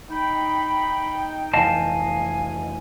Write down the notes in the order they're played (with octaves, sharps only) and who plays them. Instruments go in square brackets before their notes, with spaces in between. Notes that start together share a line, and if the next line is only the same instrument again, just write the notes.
[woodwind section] D#4 G5 [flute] B5
[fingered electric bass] F1 E3 [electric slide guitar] D#5 F5 A5 [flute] G#5